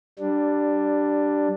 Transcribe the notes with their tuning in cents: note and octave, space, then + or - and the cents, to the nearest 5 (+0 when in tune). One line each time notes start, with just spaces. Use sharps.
G3 -10 D4 +5